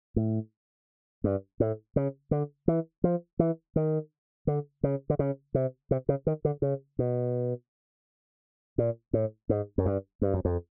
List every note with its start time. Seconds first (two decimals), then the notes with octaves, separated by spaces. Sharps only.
0.16 A2
1.24 G2
1.60 A2
1.96 C#3
2.31 D3
2.68 E3
3.04 F3
3.39 E3
3.76 D#3
4.47 D3
4.83 C#3
5.10 D3
5.19 C#3
5.54 C3
5.91 C3
6.09 C#3
6.27 D#3
6.45 D3
6.62 C#3
6.99 B2
8.78 A#2
9.13 A2
9.49 G#2
9.78 F#2
9.86 G2
10.22 G2
10.34 F#2
10.45 F2